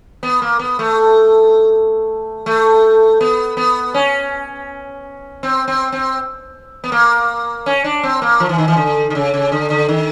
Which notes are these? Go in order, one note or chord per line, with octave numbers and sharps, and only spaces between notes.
B3
A#3
B3
A3
A3
B3
B3
C#4
C4
C4
C4
B3
A#3
C#4
D4
C4
A#3
F3
E3
D#3
E3
D3
D3
C#3
C#3
D3
D3
D#3